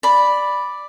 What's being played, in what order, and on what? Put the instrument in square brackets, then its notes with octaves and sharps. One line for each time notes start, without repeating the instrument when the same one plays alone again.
[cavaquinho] D5 B5